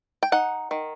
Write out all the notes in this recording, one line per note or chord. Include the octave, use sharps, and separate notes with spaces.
G5
D#4 F#5
D#3